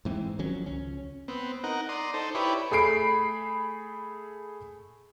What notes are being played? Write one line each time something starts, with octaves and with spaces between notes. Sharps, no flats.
G#2 E3 C4
D#3 F3 F#3 C#4
C#2 C#4
B3 C4
D#4 A#4 F#5
D5 A#5 C6 D#6
D#4 A4 C5
E4 G4 B4 C#5 D5
A3 G#4 B5 C7 D7